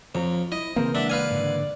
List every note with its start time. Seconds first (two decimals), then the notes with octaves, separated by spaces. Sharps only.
0.15 F2 F3 C#5 A#5
0.52 E4 D#5
0.76 C#3 E3 A#3 C4 A#4 C5
0.95 G#3 D4 E5 F#5
1.10 B4 D5 F5 G#5
1.31 G#2 D3